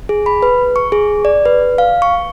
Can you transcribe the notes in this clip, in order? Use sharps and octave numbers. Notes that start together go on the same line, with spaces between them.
G#4
B5
B4
C#6
G#4
D5
B4
F5
C#6